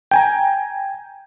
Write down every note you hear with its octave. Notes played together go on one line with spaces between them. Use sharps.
G5 G#5 A#5